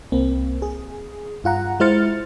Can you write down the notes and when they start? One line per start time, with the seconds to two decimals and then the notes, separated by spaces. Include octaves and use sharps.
0.12 C2 A#3 C4
0.62 G#4
1.44 G2 F4 F#5 A#5
1.80 G#3 E4 C5 F6 A6 C#7